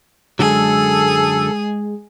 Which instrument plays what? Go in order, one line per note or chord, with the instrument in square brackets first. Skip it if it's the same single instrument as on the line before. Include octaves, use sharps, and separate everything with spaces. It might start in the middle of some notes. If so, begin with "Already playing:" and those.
[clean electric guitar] F#2 D3 F#3 [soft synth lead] G#3 [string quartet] G#4 [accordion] A4